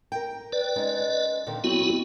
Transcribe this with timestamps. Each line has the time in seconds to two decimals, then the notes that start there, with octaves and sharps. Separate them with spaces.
0.12 A#4 G5
0.53 B4 D5
0.76 G#3 C#4 D#4
1.47 A#2 D3 D#3
1.64 F#3 B3 C4 E4 F#4